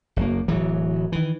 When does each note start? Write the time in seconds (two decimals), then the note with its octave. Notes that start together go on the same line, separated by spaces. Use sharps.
0.16 F#1 F#3 A#3
0.48 D1 E3 F#3
1.12 D#3 E3